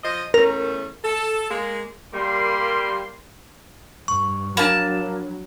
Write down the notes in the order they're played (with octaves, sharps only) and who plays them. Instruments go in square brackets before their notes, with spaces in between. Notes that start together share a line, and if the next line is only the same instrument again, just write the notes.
[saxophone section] F3 C5 D#5
[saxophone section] E2 A3 C#4 [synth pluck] A#4
[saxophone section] A4
G#3 A#3
[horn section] G3 A#3 C6
[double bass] G2 [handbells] C#6
[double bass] F#3 [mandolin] A#3 A5 [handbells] D4 B5